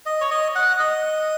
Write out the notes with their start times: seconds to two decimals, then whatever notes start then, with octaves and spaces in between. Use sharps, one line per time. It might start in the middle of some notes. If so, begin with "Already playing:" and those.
0.06 D#5
0.21 C#5
0.31 D#5
0.55 F#5
0.79 D#5